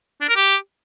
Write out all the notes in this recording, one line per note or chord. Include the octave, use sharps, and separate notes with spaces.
D4
A#4
G4